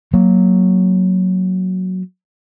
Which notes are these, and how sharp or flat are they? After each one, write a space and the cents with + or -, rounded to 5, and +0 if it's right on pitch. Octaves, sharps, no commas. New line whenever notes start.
F#3 +0 A#3 +0